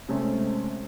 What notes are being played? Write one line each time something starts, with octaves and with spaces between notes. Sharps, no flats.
C3 G#3 A3 C4 C#4